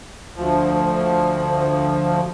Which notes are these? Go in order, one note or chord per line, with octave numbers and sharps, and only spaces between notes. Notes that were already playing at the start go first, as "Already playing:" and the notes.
D2 F3